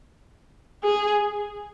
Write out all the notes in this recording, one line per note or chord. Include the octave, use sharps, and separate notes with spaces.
G#4